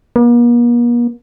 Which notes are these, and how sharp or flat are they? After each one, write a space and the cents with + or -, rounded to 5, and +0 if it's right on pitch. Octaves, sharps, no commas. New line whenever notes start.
A#3 +45